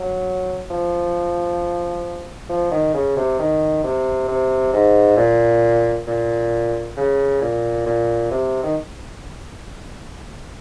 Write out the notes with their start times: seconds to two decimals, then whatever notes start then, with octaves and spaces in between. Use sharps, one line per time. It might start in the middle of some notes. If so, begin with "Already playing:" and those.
Already playing: F#3
0.70 F3
2.49 F3
2.71 D#3
2.94 C#3
3.17 C3
3.39 D#3
3.84 C3
4.28 C3
4.73 G#2
5.17 A#2
6.07 A#2
6.97 C#3
7.41 A#2
7.86 A#2
8.31 C3
8.63 D#3